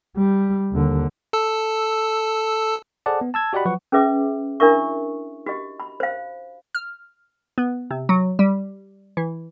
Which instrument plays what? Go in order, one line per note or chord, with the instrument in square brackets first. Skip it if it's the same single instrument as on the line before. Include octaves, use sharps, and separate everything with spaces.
[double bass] G3
D#2 D3
[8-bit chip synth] A4 A5 E6
[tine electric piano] G#4 A4 C5 D5 F#5 A5
B3
A5 E6 G#6
F#4 G4 D5 D#5 F#5 B5
F3 F#3 B4 F#5 C#6
[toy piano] C#4 G#4 B4 E5 D6
D4 E4 A#4 E5 C#6
F#4 G4 D#5
B5
C5 F5
[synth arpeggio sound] F6
B3
C3
F#3
G3
E3